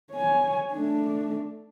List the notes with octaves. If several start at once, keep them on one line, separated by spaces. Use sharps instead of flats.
C#5 G#5
A3 D4